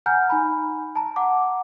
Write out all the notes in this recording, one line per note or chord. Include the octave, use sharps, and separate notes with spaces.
F#5 G#5 A#5 F6 G6
D#4 G#5 B5
A5 A#5
F#5 D6